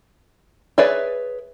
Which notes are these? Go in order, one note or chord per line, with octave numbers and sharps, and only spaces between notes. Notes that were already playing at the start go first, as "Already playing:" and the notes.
G#4 B4 C#5 D5 E5